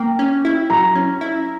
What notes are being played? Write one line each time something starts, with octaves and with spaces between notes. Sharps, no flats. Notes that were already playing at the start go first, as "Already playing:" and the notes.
Already playing: A#3 G5
C#4
E4
F#3 A#5
C#4
E4